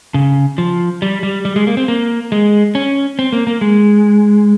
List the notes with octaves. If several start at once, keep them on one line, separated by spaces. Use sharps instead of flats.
C#3
F3
G3
G3
G3
G#3
A#3
C4
A#3
G#3
C#4
C4
A#3
A#3
G#3